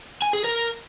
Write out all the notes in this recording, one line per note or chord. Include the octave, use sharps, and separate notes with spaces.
G#5
G#4
A#4